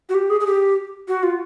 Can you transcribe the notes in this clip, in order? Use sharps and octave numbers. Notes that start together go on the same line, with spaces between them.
F#4
G4
G#4
G#4
G4
F#4
F4